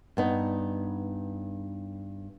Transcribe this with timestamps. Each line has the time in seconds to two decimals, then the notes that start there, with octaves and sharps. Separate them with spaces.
0.17 G2 B3 D#4